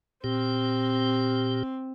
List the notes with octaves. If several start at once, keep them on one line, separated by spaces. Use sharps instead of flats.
A#2 C4 G4